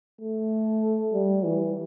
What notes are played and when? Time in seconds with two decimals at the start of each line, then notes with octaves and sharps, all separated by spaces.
0.21 A3
1.14 G3
1.45 E3